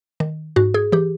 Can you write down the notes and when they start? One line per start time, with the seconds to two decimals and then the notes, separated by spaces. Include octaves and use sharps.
0.20 D#3
0.56 G#2 F#4
0.74 G#4
0.92 E3 G4